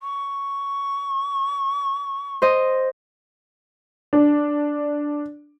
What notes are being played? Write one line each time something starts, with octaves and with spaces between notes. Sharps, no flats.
C#6
C5 D#5
D4